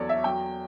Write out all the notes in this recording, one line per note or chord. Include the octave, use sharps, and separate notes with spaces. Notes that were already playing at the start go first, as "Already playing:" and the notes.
Already playing: E2 F#3 A4 C#5 D5
E5
F#3 G5